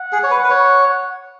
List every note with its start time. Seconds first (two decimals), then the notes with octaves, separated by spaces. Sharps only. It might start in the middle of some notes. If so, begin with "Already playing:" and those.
Already playing: F#5
0.12 G#4
0.23 C#5
0.31 B4
0.44 B4
0.50 C#5